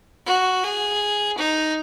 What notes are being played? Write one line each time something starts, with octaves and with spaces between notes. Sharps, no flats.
F#4
G#4
D#4